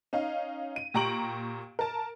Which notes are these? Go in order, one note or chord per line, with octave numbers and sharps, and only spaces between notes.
C#4 D#4 F5
D#7
A#2 G4 A#5 C#6 D7 F#7
A#4 A5